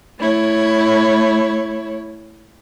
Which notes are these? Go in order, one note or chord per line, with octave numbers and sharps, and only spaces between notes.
A3 E4 C#5